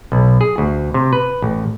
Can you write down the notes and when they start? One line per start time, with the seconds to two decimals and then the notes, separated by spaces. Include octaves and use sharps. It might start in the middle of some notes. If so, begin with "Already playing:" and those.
0.12 B1
0.41 G#4
0.58 D2
0.94 C3
1.13 B4
1.42 A1